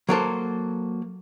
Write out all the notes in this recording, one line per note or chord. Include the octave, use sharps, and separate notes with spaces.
F#3 A#3 A4 C5